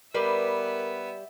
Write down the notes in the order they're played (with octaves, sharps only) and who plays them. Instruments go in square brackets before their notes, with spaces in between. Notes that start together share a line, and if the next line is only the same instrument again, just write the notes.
[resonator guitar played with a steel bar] G3 B4 D5 [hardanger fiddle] B3 E5 [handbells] A#4